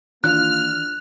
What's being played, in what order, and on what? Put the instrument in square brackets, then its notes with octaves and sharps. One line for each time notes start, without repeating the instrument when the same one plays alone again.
[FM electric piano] D#3 E3 D4 [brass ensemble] A#3 F4 [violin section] F6 [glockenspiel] F#6